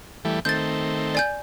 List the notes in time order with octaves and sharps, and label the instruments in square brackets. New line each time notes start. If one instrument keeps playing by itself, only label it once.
[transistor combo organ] E3 G3 A3
[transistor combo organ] D#3 A3 C4 [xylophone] G6 A6
[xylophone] D5 G#5 G6